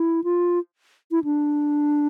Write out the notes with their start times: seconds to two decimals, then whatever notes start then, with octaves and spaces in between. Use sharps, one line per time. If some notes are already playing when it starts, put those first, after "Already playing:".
Already playing: E4
0.24 F4
1.11 E4
1.24 D4